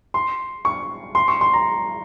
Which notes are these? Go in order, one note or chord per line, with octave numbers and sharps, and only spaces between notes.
C6
C#6
C6
C#6
C6
A#5